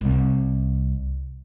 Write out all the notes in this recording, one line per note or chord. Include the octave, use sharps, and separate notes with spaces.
C2